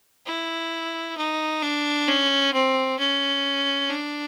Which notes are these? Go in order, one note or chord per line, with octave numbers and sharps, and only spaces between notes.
E4
D#4
D4
C#4
C4
C#4
D4